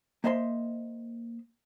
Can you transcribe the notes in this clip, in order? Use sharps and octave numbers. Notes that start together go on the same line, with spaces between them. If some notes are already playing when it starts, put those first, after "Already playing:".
A#3 C5 D#5 E5 G#5 C6